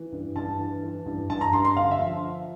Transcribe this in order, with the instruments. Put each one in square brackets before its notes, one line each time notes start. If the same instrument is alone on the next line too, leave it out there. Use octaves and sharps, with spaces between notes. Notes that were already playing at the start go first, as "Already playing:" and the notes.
Already playing: [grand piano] E3
G2
G2 A5
E3
E3
G2
G2 A5
A#5
G2 C6
C6
D3 F5
E5
F3